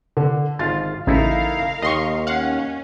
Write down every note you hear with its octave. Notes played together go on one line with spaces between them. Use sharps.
D3
G#1 F4 F5 A6
A1 C#3 D#4 E4 A4 A#4 F5
D#2 D#5 C6 C#6
C#4 F5 F#5